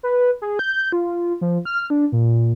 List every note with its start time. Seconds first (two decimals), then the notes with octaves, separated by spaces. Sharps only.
0.03 B4
0.42 G#4
0.59 G6
0.92 F4
1.41 F3
1.65 F6
1.90 D4
2.12 A#2